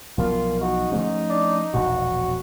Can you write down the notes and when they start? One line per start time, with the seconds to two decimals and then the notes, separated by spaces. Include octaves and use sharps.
0.18 B1 A#2 F3 B3 F4
0.61 D#4 F#4
0.92 G#2 F3 A3 C#4
1.30 D4
1.74 E1 A#1 B2 F#4